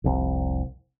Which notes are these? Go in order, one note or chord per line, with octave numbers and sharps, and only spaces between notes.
F1 C2